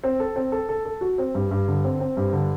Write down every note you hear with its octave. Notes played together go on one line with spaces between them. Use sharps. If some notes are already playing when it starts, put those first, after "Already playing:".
C4
A4
C4
A4
A4
A4
F#4
C4
G2
G2
D3
C4
C4
G2
D3